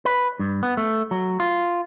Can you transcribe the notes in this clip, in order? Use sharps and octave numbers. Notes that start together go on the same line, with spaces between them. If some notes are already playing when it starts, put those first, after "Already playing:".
B4
G2
B3
A3
F#3
F4